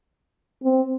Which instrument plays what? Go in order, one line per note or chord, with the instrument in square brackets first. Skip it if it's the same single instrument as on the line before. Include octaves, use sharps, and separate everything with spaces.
[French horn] C4